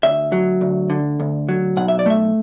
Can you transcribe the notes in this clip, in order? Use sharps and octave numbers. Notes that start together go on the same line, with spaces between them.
D2 E5
F#3
D2
D3
D2
F#3
B1 F#5
E5
D5
A3 E5